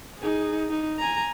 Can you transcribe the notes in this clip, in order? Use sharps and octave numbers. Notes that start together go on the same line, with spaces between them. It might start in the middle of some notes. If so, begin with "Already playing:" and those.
D#4 G#4
D#4
G#5 A#5